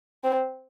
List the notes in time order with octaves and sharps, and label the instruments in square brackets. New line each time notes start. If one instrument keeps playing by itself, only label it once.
[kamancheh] C4